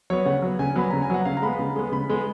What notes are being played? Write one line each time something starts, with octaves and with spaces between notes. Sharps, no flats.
F#3 B3 C#5
C#3 F#5
F#3 B3
C#3 G#5
F#3 B3 B5
C#3 A#5
G#5
F#3 B3 F#5
C#3 F5
A#5
G#3 B3 B5
C#3
G#3 B3
C#3 B5
G#3 B3